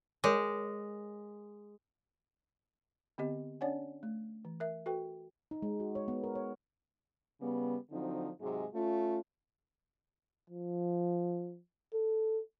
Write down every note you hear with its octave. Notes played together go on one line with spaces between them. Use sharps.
G#3 A#4 C#5 D6
D3 B3 C4 G4 D#5
C#4 D4 C#5 D5 F#5 G#5
A3
E3
A#4 E5
F#4 A4 B4 G5
D#4
G#3
F#4
C#5
B3
A#4
C#5
C#3 G3 B3
D3 F3 F#3 C4 D#4
G#2 C3 F#3 G#3
A3 C#4 F4
F3
A4